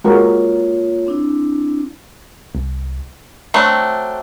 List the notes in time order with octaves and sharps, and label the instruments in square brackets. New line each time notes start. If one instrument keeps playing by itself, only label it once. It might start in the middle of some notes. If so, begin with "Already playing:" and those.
[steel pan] G#3 F#4 A#4 [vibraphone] A#3 F4 C#5
[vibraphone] C4 D4 E4
[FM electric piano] C2
[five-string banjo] F#3 A3 C4 D4